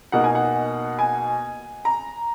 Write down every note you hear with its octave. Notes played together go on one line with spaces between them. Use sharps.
B2 A#3 D#4 F#5
G#5
F#5
G#5
A#5